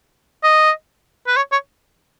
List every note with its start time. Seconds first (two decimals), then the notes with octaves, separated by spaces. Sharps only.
0.43 D#5
1.27 B4
1.37 C#5
1.52 C#5